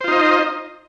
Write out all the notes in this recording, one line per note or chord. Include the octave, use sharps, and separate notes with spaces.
D#4 F4 C5 D#5